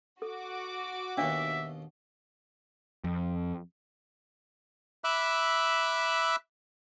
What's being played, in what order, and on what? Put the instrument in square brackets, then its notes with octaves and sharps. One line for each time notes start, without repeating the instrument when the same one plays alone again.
[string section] F#4 D6 [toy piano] A4
[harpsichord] D#2 B2 [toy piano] D4 C#5 F5 [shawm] E5
[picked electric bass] F2
[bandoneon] E5 B5 D6 E6 F#6